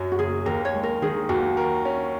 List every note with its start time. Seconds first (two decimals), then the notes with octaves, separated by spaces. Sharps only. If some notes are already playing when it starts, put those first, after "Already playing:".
Already playing: F#2 F#3
0.12 F#4
0.19 F#1 G#4
0.46 D#2 A#4
0.65 C#5
0.74 G#3
0.83 A#4
1.02 D#3 G#4
1.29 D#2 F#4
1.57 A#4
1.85 C#4